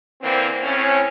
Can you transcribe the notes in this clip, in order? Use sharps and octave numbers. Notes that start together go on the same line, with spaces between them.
D3 E3 A#3 C4
A2 C4 C#4